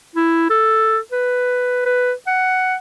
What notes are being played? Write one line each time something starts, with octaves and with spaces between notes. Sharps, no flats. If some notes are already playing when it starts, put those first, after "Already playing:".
E4
A4
B4
B4
F#5